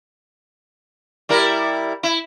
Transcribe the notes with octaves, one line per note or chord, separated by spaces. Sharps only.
G3 E4 A#4
E4